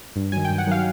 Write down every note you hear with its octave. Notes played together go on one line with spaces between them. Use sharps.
G2
D#3 F#3 G#5
G5
G2
F#5
D#3 F#3 F5